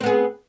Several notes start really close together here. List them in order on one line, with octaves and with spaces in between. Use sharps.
C4 B3 G#4